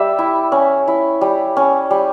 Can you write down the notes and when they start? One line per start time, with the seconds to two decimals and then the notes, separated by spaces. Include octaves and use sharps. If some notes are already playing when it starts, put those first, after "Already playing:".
Already playing: G3 E5
0.19 E4
0.52 C#4
0.88 E4
1.21 G3
1.57 C#4
1.91 G3